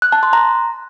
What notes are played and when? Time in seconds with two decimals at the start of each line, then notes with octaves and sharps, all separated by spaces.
0.02 F#6
0.12 A5
0.23 C6
0.33 A#5